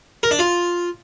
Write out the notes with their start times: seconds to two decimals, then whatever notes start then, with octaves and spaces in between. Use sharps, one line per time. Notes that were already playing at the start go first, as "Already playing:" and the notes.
0.23 A#4
0.31 D4
0.39 F4